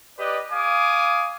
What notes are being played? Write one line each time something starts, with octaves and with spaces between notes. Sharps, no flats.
G4 B4 D5 D#5
F5 G#5 D6 D#6